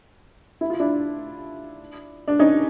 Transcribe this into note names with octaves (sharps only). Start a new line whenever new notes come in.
E4
F4
D4 E4
D4
C#4 D#4